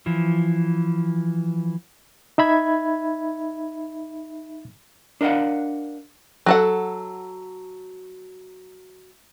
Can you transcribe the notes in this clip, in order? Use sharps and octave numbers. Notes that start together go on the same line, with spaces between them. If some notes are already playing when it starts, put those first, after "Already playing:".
E3 F3
D#4 E5 B5 G#6
D4 A#4 D#5 F5 F#5
F#3 A4 F#5